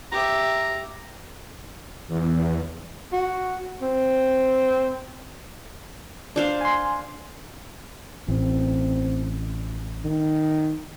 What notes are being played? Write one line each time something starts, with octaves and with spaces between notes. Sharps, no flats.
G4 E5 A#5
E2
F#4
C4
D4 C5 F5
G#5 C6
A1 C4
D#3